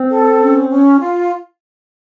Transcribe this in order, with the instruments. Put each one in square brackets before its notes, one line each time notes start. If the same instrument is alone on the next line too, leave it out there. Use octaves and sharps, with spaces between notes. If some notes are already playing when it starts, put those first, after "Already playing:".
Already playing: [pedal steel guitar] C4
[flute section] A4
C#4
C#4
F4